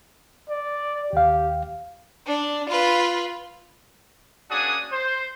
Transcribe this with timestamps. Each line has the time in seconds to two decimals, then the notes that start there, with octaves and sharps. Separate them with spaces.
0.49 D5
1.13 D#2 G4 F5
2.27 D4
2.70 F4 B4
4.51 A#3 C#4 D4 F#4 G#4 D#6
4.92 C5